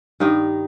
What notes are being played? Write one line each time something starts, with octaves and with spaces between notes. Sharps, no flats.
G2 D#3 D#4